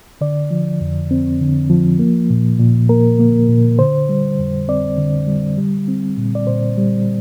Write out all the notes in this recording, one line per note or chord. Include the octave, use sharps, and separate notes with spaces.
D3 D5
F3
F2
C4
D3
F3
A#3
A#2
A#2
A#3 A#4
A#3
A#2
D3 C5
G3
F2
C4 D5
D3
G3
G3
C4
A#2
D5
A#2 C5
G3